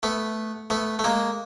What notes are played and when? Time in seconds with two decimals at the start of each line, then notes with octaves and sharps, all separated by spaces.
0.03 A3 B3
0.70 A3 B3
0.99 A3
1.04 G#3 A#3